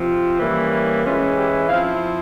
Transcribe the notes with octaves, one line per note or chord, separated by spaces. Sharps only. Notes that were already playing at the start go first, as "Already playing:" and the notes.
Already playing: C3 F3 C4
E3 G3 A#3 C#4 E4
E4
E3 G#3 C#4 E4 F4
G4
F3 C4 E4 F5